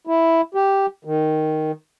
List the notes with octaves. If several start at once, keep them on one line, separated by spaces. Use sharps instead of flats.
E4
G4
D#3